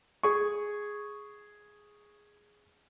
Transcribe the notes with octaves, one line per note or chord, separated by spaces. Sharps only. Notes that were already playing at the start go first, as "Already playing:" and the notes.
G#4 C#6